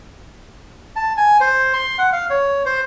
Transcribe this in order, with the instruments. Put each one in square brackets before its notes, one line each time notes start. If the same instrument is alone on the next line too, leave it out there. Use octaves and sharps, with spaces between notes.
[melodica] A5
G#5
C5
C6
F#5
F5
C#5
C5